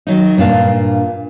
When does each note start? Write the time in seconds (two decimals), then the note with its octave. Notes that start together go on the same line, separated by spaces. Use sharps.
0.07 D#3 F#3 D#4
0.37 G2 A#2 D4 F5